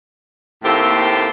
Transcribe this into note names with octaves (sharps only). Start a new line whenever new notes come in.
D#2 A2 A#3 C4 G4 A4